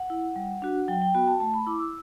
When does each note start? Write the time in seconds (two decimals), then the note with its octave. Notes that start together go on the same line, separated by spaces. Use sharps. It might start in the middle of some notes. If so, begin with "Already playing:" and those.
Already playing: F#5
0.10 E4
0.36 G3
0.62 D4 F#4
0.88 F#3 G5
1.02 G5
1.14 B3 F#4 G5
1.27 A5
1.40 A3 A5
1.54 B5
1.66 E4 D6
1.80 E6